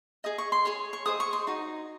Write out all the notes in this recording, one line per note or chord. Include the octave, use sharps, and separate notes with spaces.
G#4 D#5 D#6
C#6
C6
G#4 C#5 C6
C#6
G#4 C5 D#5 D#6
C#6
C6
D#4 F#4